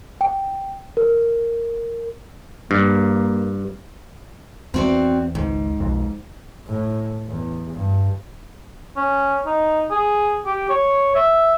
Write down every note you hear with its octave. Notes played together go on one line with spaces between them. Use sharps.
G5
A#4
G2 A#3
E2 C4 F#4 D5
G#1 C#2 G#2
B1 F2
A2
E2
G2
C#4
D#4
G#4
G4
C#5
E5